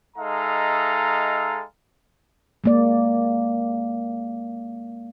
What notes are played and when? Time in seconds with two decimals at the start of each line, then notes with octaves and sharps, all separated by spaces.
0.17 G#3 D#4 A4 E5 F5 A#5
2.64 G#3 A#3 D5